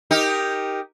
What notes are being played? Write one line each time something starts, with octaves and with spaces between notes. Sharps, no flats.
D#4 G4 A#4